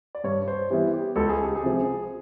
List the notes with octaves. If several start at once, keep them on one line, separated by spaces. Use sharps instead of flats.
D5
G2 C#5
C5
E3 G3 B3 E4 G4
G4
C#2 A4
G#4
G4
G#4
C3 F3